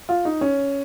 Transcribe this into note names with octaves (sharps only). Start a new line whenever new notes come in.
F4
D#4
C#4